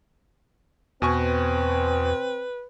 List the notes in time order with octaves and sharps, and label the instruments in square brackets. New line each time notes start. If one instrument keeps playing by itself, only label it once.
[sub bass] E2 [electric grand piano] B2 G#5 C#6 [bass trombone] C4 [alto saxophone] B4